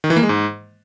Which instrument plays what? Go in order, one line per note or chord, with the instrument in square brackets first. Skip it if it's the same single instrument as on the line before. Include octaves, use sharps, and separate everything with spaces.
[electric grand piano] D#3
E3
A#3
G#3
G#2